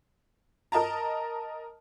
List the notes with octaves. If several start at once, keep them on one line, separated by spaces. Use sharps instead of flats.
A#4 D#5 A5 A#5